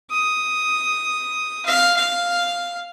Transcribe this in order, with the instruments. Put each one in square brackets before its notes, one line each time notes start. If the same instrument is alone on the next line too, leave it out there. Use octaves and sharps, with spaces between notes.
[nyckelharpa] D#6
F5
F5